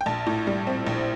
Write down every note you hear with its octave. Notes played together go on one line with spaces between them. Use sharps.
G5
A#1 A5
A2
G3
C4
A#1